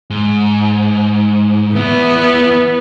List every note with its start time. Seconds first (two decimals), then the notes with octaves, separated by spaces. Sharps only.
0.10 G#2
1.75 E2 B3 E4